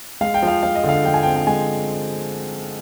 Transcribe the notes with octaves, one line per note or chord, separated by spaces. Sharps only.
G#3 F5
G5
F3 F5
F3 F5
D#5
D3
F5
F3 G5
G#5
G5
C4
G5
G#3 G#5